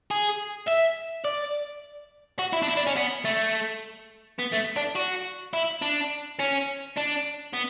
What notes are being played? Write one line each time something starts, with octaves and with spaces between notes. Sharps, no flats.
G#4
E5
D5
F#4
E4
D4
E4
D4
C#4
B3
A3
B3
A3
D4
F#4
E4
D4
C#4
D4
B3